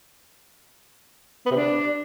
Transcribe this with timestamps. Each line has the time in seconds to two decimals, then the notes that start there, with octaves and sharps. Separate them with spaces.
1.46 B3
1.51 C3
1.56 D4